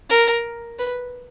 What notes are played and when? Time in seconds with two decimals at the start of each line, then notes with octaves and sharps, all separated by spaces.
0.10 A#4
0.79 B4